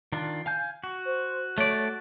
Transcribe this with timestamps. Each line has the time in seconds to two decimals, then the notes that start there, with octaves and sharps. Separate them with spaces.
0.12 D#3 D4 F4
0.46 F5 G#5 G6
0.84 F#4
1.05 C5
1.58 A3 C#5 D5